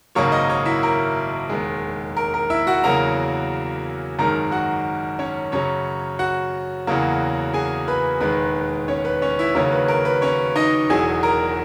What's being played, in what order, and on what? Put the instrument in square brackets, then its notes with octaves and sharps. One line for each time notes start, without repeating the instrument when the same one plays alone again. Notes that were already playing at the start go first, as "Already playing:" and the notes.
[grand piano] G#1 F#2 C#3 F#3 A#3 C#5 C#6
D#5 D#6
C#5 C#6
E4 E5
A#4
E1 D#2 D#3 G#3
A#4
A#4
E4 E5
F#4 F#5
E2 C#3 F#3 A#3 A#4 A#5
G#1 F#2 D#3 G#3 A#4 A#5
F#4 F#5
C#4 C#5
F#2 C#3 F#3 C#4 C#5
F#4 F#5
E2 C#3 F#3 A#3
G#4 G#5
B4 B5
E1 D#2 D#3 G#3 B4 B5
C#4 C#5
B4
C#4 C#5
E4 E5
D#2 C#3 F#3 A#3 C#4 C#5
B4
A#4
B4
C#4 C#5
D#4 D#5
E1 E2 B2 F#3 G#4 G#5
A#4 A#5